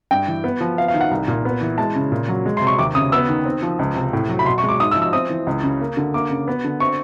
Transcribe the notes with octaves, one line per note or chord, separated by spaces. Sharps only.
G2 G5
E3
B3
F3
B3 F5
F5
D#3
F#5
C2
A#2
B3
E3
G#3 A5
C#3
A#2
F#3
G#3
C6
C3
C#6
D#2 D6
C#3 D#6
B3 E6
D#3
C4
F3
C#2
C3
A2
F#3
B5
B2 C6
C#6
G#3 D6
G#2 D#6
E6
F3
E6
C4 D#6
E3
C#2
C#3
A#3
D3
A#3 D6
C#3
B3
D3
C4 C#6